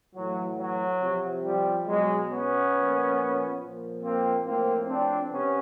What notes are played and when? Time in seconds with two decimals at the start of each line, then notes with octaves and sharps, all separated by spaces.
0.14 A2 E3 F#3
0.58 F#3
1.00 C3 F3
1.44 F3 G3
1.86 B2 F#3 G#3
2.29 B3 C#4
2.73 A#2 F3
3.59 A#2 F3
4.02 A#3 C4
4.44 A2 F3 A#3 C4
4.88 C4 D4
5.30 C3 B3 C#4